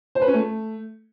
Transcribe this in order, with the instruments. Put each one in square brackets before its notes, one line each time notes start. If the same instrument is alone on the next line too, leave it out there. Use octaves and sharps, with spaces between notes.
[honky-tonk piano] C5
B4
C#4
A3